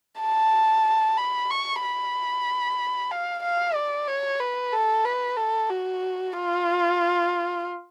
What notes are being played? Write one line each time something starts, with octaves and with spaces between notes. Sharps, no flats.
A5
B5
C#6
B5
F5
F5
D5
C#5
B4
A4
B4
A4
F#4
F4